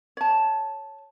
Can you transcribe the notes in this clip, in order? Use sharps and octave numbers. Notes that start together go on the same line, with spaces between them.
C#5 A5